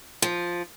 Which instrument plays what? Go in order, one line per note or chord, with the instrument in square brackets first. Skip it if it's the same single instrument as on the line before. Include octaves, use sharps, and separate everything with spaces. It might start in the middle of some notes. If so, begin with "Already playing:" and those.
[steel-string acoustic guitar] F3